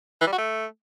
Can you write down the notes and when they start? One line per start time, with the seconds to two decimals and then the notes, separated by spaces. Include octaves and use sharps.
0.21 E3
0.27 G3
0.33 F#4
0.38 A3